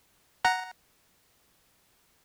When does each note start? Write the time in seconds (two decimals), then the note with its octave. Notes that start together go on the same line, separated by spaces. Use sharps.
0.45 F#5 A#5